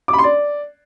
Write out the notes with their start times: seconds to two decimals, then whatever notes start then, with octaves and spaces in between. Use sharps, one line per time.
0.08 D6
0.13 B5
0.18 C6
0.24 D5